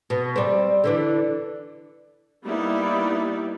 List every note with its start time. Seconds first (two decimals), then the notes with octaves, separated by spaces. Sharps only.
0.10 B2
0.36 G3 C4
0.84 D3 E3 D4
2.44 G3 A#3 B3 D#4 E4 D5